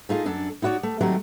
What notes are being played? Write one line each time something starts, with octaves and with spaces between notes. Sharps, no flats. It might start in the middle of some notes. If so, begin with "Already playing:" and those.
A3 D#4 F4 G#4
F#2 D4 A4
D#4 E4 F#4 C#5 D5
A3
D#3 F#3 G3 A3 C4